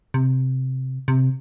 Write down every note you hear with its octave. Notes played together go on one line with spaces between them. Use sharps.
C3
C3